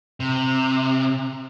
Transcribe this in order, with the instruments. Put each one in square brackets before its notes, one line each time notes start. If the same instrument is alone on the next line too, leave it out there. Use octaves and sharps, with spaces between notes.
[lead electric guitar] C3